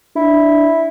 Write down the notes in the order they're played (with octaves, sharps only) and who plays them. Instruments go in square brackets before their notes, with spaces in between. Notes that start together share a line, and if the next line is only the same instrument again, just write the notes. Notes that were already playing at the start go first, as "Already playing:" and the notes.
[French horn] D4 [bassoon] E4